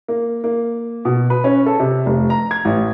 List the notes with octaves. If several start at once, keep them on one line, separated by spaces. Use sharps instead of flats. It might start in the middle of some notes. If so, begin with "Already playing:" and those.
A#3
A#3
B2
B4
C#4
A4
C3
F1
A#5
G#6
A1